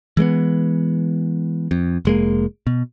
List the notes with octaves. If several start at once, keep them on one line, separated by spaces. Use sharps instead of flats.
E3 G#3 A#3 B3
F2
F1 G#3 A#3
B2